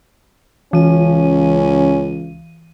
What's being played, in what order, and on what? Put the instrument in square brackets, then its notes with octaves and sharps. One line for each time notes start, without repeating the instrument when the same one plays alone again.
[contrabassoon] C#2 [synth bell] E3 D#7 [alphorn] C#4